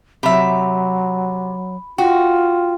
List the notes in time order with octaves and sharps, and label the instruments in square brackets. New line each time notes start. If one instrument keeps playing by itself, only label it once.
[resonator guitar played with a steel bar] C3 E5 [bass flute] F#3 [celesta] B5
[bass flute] F4 [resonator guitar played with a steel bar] F#4 [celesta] F#5 G5